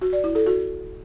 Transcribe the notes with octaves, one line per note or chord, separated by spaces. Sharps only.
F#4
D5
E4
A4
F#4